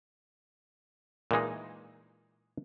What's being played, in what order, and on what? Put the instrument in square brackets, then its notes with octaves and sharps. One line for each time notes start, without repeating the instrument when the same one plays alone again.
[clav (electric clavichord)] A#2 E3 G#3 D#4